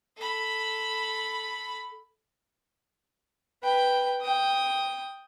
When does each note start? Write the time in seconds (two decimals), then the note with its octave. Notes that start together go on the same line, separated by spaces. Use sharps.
0.17 A4 B5
3.64 B4 G5
4.22 G5 D#6